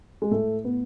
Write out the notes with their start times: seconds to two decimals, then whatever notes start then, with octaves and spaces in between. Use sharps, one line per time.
0.22 G#3
0.31 A2 A3
0.65 B3